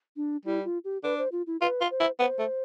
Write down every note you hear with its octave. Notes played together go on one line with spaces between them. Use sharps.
D4
G3 E4
F4
G4
D4 B4
C5
F4
E4
F4 B4
F4
C5
E4
B3 C5
A3